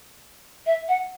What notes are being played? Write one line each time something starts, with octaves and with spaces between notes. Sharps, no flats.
E5
F#5